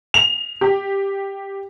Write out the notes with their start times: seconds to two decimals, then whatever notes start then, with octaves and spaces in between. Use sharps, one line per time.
0.14 F7
0.61 G4